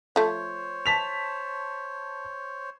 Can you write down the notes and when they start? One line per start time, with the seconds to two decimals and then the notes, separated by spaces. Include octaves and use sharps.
0.16 F3 A3 C5 C#5
0.86 A5 B6 F7